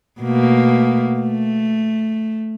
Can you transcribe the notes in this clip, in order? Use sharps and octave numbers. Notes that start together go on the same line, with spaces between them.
B2 A3 A#3
A3